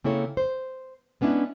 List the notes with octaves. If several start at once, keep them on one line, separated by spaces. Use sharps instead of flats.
C#3 A#3 C4 E4 A4 C#5
C5
G#3 B3 C#4 D4 E4